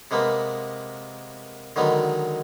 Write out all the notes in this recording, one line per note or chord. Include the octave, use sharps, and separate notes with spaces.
C3 G#3 A#3 B3
D3 D#3 F#3 G#3 B3